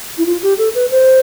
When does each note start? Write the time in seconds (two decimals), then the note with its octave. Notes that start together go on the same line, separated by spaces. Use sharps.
0.18 E4
0.26 F4
0.43 G4
0.58 A4
0.75 B4
0.90 C5